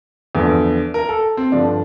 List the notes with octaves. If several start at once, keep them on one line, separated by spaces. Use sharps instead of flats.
E2 D3 F3
A#4
A4
C4
G2 D3 F3 D4